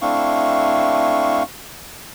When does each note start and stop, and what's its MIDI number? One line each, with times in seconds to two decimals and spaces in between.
0.02 1.43 57
0.02 1.43 60
0.02 1.43 62
0.02 1.43 64
0.02 1.43 77
0.02 1.43 85